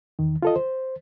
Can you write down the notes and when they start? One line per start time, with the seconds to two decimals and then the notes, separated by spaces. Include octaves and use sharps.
0.19 E2 D#3
0.42 F4 A4 D#5
0.56 C5